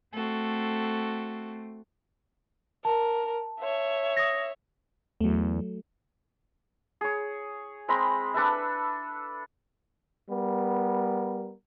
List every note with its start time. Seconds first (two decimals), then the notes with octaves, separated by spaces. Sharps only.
0.13 A3 C4 F#4 A4
2.85 A#4 A5
3.61 C#5 E5
4.17 D#6 A#6
5.21 E2 F#3 A3
7.01 G#4 C#5
7.88 G#3 C4 A#5 B5
8.34 D4 A4 B4 E5
10.30 G3 B3 A#4